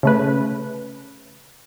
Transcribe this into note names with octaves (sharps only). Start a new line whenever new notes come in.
C#3 A3 B4